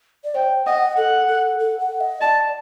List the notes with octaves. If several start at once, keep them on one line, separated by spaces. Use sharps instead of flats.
D5
C5 G5
D#5 F#5
A4 F#5
A4
A4
F#5
D#5
D5 A5